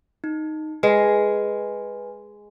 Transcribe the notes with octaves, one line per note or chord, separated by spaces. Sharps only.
D#4
G#3 B4 G#5